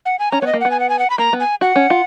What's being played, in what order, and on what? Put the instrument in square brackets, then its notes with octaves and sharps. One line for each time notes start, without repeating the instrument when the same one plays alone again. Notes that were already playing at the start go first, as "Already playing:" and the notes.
[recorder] F#5
G#5
[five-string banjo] C#4 [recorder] A#5
[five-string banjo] B3 [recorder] C#5
[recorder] D#5
[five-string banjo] A#3
[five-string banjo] B3 [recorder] F#5
[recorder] G#5
F#5
G#5
F#5
B5
[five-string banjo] A#3 [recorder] A#5
[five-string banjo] B3
[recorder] G#5
[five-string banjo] F#4 [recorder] F#5
[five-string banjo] C#4
F4